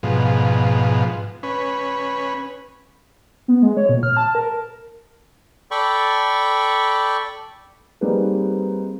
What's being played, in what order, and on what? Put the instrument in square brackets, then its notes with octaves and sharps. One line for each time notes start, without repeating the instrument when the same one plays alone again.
[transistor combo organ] G#2 B2 F3
C#4 B4
[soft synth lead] B3
G#3
C#5
A#2
F6
A5
A#4
[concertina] A4 D5 G5 B5 C#6
[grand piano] G3 A#3 C4 D#4 G#4 B4